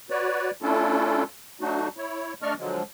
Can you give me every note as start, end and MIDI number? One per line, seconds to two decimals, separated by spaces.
0.10 0.51 66
0.10 0.51 71
0.10 0.51 73
0.10 0.51 74
0.62 1.23 57
0.62 1.23 61
0.62 1.23 62
0.62 1.23 64
0.62 1.23 65
0.62 1.23 69
1.61 1.88 54
1.61 1.88 57
1.61 1.88 62
1.61 1.88 63
1.61 1.88 66
1.97 2.33 64
1.97 2.33 73
2.42 2.54 57
2.42 2.54 62
2.42 2.54 74
2.42 2.54 75
2.42 2.54 85
2.42 2.54 89
2.58 2.83 50
2.58 2.83 53
2.58 2.83 54
2.58 2.83 56